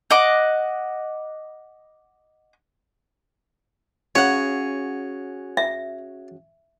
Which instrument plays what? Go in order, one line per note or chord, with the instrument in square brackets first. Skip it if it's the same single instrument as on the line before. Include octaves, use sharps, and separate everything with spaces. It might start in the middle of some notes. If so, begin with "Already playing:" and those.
[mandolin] D#5 F#5 D6
[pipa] C#3 F#5 [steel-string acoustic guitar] C#4 F#4 G#4 [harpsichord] C#5
[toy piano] E5